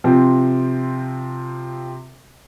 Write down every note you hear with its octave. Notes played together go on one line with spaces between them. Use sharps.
C3 F3 C4